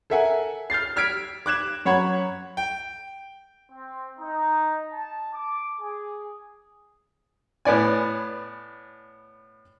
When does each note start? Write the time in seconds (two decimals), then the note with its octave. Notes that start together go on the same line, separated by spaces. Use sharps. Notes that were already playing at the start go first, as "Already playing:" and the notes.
0.10 A4 A#4 E5 F#5 G#5
0.70 F6 G6 A6 C7
0.96 E6 F6 G#6 B6 D7
1.46 D6 F#6 G#6 E7
1.85 F#2 C#5 F#5 B5 G#6
2.57 G5
3.72 C4
4.19 D#4
4.93 A5
5.34 D6
5.82 G#4
7.65 A2 B3 D5 G#5